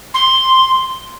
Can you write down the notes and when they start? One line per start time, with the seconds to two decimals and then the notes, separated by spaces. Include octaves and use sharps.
0.14 C6